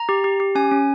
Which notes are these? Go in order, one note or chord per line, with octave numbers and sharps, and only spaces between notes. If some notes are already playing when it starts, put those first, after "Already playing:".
Already playing: A#5
G4
G4
G4
C#4 G#5
C#4